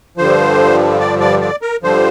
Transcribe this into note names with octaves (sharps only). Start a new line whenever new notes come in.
G2 D3 F3 C5
D5
D5
D5
A#4
G2 D3 F3 C5